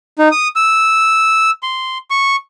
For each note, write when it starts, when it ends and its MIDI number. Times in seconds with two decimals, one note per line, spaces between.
0.19 0.28 63
0.31 0.48 87
0.56 1.51 88
1.63 1.98 84
2.10 2.36 85